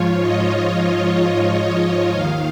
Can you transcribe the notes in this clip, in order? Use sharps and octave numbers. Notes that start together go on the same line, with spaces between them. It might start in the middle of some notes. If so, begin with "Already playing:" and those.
Already playing: G#2 F3 F4 C#5
D#5
D#2 D#3 F5